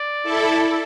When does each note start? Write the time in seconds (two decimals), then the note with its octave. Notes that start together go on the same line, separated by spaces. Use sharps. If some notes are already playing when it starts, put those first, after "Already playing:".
Already playing: D5
0.23 E4 A4